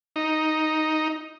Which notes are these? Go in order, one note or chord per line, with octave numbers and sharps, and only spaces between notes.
D#4